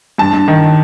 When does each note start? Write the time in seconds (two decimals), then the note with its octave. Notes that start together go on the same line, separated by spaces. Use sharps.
0.18 G2 A5
0.33 G2
0.48 D#3